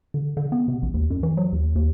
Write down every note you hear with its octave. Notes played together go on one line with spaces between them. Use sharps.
D3
D3
B3
C3
A#1
D#2
F#2
E3
F#3
D#2
D#2